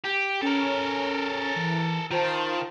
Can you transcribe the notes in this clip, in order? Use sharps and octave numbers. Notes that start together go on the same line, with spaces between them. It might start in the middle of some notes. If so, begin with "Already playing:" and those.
G4
C#4 A4 A#4
E3
D#3 F4 C5 A5